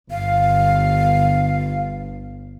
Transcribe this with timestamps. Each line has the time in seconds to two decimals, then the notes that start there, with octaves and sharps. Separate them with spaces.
0.11 G1 F5